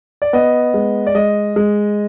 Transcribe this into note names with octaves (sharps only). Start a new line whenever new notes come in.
D5
B3 D#5
G#3
D5
G#3 D#5
G#3